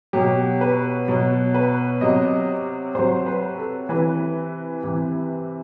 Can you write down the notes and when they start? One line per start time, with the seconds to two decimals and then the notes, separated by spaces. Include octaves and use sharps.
0.13 B2 F#3 G4
0.61 B4
1.08 B2 F#3
1.54 B4
2.01 C3 F#3 D#5
2.95 C3 F#3 C5
3.26 B4
3.58 A4
3.89 C3 E3 B4
4.83 C3 E3